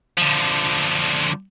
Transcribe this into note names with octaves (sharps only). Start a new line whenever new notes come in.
D3 F3